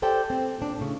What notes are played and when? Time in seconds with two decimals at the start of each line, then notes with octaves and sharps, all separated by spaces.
0.02 G4 A4 C5 D5 G5
0.30 C4
0.58 A#2 D4
0.78 A2 C#3